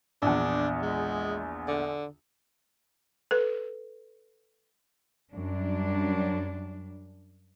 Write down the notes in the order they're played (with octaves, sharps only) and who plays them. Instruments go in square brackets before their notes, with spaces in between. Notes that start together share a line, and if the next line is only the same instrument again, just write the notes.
[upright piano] A#1 E2 [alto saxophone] D4
[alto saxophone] G#3
D3
[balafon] A4 B4
[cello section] F#2 G3 D4